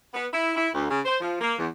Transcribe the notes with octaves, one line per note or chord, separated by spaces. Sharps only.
B3
E4
E4
D2
C#3
C5
F3
A#3
E2